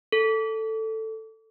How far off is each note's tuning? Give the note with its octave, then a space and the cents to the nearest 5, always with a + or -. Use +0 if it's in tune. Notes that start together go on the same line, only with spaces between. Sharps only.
A4 +10